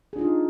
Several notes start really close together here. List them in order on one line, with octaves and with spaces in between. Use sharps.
G#4 D4 F4 D#4